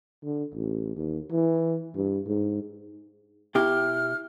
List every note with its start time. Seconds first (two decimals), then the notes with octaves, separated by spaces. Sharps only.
0.24 D3
0.54 A1
0.96 D#2
1.31 E3
1.95 G2
2.27 G#2
3.55 B2 E4 G4 F6